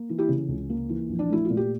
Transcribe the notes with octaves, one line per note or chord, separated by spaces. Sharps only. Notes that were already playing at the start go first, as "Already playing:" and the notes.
Already playing: A#3
E3
E4 G4
C#3
C#2
A#3
E3
A#1
D4
A3 E4
F4
A#2
G4